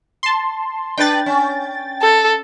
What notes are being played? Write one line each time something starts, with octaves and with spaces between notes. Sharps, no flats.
A5 C6
D4 B4 G5 A6
C#4
A4